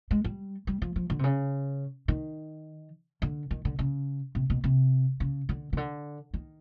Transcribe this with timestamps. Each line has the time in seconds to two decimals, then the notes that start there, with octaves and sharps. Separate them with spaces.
0.11 G#3
0.24 G3
0.67 G3
0.82 F3
0.96 F3
1.10 D3
1.19 C3
1.24 C#3
2.08 D#3
3.22 D3
3.51 D#3
3.65 D3
3.79 C#3
4.35 C3
4.50 B2
4.64 C3
5.20 C#3
5.49 D3
5.73 C#3
5.77 D3
6.34 D#3